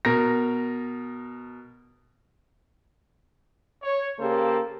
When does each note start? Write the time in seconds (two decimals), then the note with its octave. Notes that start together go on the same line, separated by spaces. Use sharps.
0.05 B2 A#4 A#6
3.83 C#5
4.19 C#3 A#3 G4 A4 C5